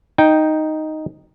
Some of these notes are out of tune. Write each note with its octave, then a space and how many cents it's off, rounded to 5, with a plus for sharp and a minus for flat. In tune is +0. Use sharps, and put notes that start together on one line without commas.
D#4 +0 G5 +0